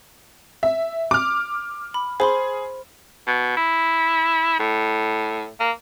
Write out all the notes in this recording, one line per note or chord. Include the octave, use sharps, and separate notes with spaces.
E5
D6 F6
B5
G#4 C5 B5 C6
B2
E4
A2
A#3